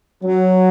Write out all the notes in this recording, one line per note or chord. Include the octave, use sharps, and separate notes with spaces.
F#3